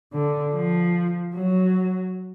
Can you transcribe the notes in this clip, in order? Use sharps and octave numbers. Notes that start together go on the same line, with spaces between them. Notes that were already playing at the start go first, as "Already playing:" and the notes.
D3
F3
F#3